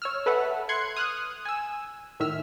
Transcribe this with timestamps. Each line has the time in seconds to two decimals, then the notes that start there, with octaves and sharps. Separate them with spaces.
0.02 C#5 E6 F6
0.26 A4 B4 E5 F#5
0.69 C6 F#6 G#6 C#7
0.97 D#6 F6 F#6
1.45 G#5 E6
2.20 A2 D#3 E5 E6 F6